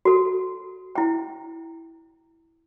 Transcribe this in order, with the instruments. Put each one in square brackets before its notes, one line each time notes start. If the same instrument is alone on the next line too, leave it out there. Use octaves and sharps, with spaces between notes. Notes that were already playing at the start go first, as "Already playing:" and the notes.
[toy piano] F#4 A4
E4 G5